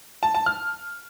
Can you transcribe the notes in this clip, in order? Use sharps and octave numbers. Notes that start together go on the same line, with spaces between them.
A5
A5
F6